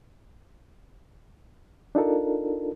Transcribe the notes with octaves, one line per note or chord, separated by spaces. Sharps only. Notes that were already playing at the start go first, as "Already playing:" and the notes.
D4 D#4 F4 A4 A#4